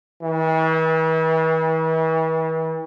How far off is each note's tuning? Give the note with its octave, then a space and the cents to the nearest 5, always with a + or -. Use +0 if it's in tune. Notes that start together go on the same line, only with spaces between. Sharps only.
E3 -40